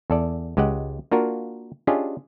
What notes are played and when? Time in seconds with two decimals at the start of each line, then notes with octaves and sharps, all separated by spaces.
0.10 E2 A4 D5
0.57 C#2 G#3 G4 D#5 F#5
1.12 A#3 D4 F4 F#4 A#4
1.87 C#4 D4 F4 G4 G#4 D#5